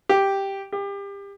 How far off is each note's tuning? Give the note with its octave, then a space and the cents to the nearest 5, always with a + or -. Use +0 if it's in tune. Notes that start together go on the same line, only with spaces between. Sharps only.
G4 +0
G4 +30